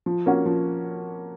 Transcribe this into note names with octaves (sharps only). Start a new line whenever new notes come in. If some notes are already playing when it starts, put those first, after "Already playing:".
F3
A#3 C#4 F#4
F3